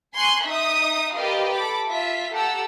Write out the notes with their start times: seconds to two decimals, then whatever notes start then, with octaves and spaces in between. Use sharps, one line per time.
0.14 G#5 C6 C#6 F#6
0.44 D#4 E5 D#6
1.15 G4 A#4 B4 D5 D#5 F5
1.52 A4 B5 D6
1.87 F4 E5 B6
2.32 G4 A4 F#5 A#5 E6